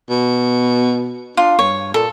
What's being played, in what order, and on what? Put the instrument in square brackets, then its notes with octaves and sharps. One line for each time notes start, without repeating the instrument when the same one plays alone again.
[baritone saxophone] B2
[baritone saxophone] D4 [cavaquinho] F4
[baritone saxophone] G2 [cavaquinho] C#5
[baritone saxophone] A#2 [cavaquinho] A4